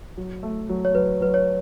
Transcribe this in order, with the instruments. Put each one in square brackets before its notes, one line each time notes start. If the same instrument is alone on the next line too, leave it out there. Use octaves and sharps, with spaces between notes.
[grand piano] F#3
A3
F#3
[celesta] C#5
[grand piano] F#3 [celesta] B4
[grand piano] F#3 [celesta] B4
[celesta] C#5